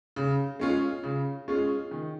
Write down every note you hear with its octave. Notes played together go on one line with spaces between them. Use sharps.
C#3
G#3 C#4 F4 G#4
C#3
G#3 C#4 F4 G#4
D#3